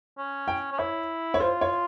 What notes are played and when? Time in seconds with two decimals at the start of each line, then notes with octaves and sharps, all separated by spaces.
0.18 C#4
0.48 G5
0.72 C#4
0.79 E4 C#5
1.34 C#5
1.40 F4 C5
1.61 C#5